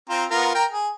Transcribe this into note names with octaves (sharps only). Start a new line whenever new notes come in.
C4 F4 A#5
B3 F4 A#4
A#4 G5 A#5
G#4